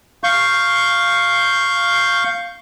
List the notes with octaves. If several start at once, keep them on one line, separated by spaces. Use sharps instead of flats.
F5 C#6 G6